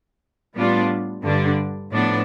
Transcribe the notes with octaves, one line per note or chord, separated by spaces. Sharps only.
A2 G3 B3 D4 F4
G2 D3 G3 D4
A2 F3 B3 D4